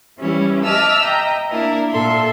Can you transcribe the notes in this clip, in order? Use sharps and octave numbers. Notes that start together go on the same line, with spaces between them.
E3 G3 C#4 E4
D#5 E5 A5 D6 E6 F6
D#5 E5 G5 A#5
A#3 D4 E4 A#4 E5
A#2 A4 E5 C6